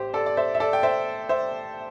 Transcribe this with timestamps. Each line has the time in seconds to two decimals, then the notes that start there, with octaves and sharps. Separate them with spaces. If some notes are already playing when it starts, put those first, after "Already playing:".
Already playing: A1 G4 C5
0.14 A4 D5
0.26 D5
0.37 C5 E5
0.55 E5
0.60 A4 D5
0.73 G5
0.83 C5 E5
1.29 C5 E5